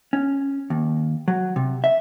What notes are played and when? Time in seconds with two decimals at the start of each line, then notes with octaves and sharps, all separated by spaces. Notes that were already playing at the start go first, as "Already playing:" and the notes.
0.13 C#4
0.70 D#2
1.28 F#3
1.56 C3
1.84 E5